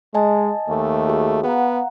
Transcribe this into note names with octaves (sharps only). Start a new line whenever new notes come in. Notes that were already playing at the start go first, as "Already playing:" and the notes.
G#3 D#5 G#5 A5
D#2 A3
F#4 G#4
B3 F5 F#5 A#5